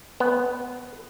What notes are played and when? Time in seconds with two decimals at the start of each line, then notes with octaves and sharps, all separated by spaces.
0.20 B3